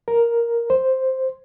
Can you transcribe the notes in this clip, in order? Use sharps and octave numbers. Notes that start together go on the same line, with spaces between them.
A#4
C5